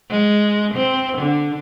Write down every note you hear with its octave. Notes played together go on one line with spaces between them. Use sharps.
G#3
C4
D3